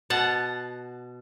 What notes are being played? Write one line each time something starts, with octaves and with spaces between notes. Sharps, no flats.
B2 F#5 A5